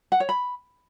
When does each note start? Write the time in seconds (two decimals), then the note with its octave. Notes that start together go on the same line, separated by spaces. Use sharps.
0.12 F#5
0.20 C#5
0.29 B5